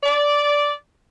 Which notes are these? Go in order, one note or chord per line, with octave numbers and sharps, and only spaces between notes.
D5